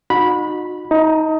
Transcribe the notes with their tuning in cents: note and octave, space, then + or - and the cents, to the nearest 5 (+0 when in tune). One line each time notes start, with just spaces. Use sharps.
D#4 -25 F#4 -35 B5 -10
D#4 +20 A#5 -45